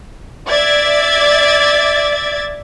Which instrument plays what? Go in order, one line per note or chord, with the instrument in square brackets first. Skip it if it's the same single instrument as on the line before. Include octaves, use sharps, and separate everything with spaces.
[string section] D5 E5 G#6 A6